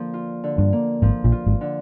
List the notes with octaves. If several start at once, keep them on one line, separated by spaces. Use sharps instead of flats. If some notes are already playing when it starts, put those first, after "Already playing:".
Already playing: D3 F3 A#3
F4
D3
G2
A#3
G#1 G#2 F3
A#1 A#2
F4
G#1 G#2
D3